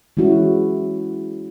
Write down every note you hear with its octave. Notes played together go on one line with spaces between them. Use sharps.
E3 G#3 C#4 E4 F#4